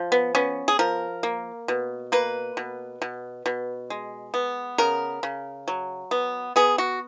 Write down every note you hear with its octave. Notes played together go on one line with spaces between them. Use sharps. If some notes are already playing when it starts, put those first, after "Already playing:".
Already playing: F3
B3
B3 C#4
G#4
F3 A#4
A#3
B2
A#3 B4
B2
B2
B2
G#3
B3
C#3 A#4
C#3
F#3
B3
B3 G#4
F#4